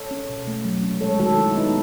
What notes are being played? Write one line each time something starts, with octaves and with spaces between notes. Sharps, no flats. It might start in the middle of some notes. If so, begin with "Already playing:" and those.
Already playing: A4 C#5
C#4
B2
A3
F#3
C#4
G#3 A4 C#5
D#3 F#4 A4
D#3 E4
B3 D#4